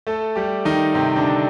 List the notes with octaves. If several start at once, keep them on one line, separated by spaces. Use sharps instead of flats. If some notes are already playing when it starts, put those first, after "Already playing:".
A3 A4
G3 G4
D#3 D#4
C3 C4
D3 D4